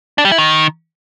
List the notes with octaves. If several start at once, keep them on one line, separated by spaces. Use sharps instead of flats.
D4
G3
E4
D#3